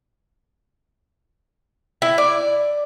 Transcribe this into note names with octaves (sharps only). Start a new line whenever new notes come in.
E4
D5